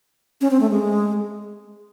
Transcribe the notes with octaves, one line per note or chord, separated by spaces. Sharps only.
C#4
C4
A3
G#3